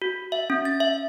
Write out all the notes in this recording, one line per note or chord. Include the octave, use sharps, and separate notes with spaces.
F#4
E5
C#4
A6
E5